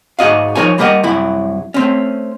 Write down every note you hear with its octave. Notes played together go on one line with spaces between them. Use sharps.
G#2 F#4 D#5 F5
F3 D#4 A#4 C#5 G#5
G3 A#3 G4 A#4 D#5 F#5
C2 F#2 F#3 E4 B5
A3 C4 C#4